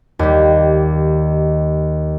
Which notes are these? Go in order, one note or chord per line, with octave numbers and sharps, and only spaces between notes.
D#2 G3